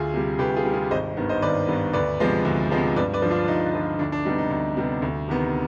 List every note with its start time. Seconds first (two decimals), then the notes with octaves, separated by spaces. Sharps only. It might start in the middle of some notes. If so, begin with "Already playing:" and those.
Already playing: D2 F4 G#4
0.14 C3 G3
0.39 D2 G4 B4
0.56 F4 G#4
0.65 C3 G3
0.73 F4 G#4
0.91 G#1 C5 D#5
1.17 G2 D#3 B3
1.29 C5 D#5
1.42 G#1 B4 D5
1.68 G2 D#3 B3
1.93 D2 B4 D5
2.19 C3 F3 G#3 B3
2.45 D2
2.71 C3 F3 G#3 B3
2.96 G2 B4 D5
3.14 B4 D5
3.22 D3 F3
3.31 D4 F4
3.48 G2 D#4
3.73 D3 F3
3.99 D2 D4
4.12 D4
4.25 C3 G3 B3 D#4
4.38 D#4
4.51 D2
4.77 C3 G3 B3
5.02 D2
5.28 C3 D#3 B3